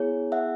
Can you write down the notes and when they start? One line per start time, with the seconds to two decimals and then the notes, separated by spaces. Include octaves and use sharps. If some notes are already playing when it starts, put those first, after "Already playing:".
Already playing: B3 E4 G#4 C#5
0.32 E5 F#5